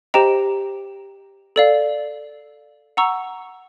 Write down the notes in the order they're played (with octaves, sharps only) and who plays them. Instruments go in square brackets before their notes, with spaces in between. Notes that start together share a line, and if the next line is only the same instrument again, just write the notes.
[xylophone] G4 C5 D#5 G5 A#5
A4 D5 F5
F#5 A#5 C#6 E6